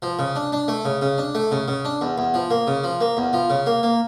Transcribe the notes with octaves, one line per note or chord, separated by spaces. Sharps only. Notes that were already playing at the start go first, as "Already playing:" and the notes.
F3
C#3
D4
D4
A3
C#3
C#3
D4
A3
C#3
C#3
D4
E2
E2
F3
A#3
C#3
F3
A#3
E2
F3
C#3
A#3
A#3